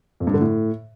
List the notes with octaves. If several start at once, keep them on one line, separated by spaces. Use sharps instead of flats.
F2
G2
D3
A2